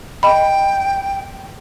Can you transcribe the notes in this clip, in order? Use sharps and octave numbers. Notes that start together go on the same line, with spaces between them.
D#5 G5 B5